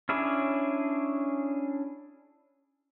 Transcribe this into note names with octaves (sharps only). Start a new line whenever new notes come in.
C#4 D4 E4 G#4 C#5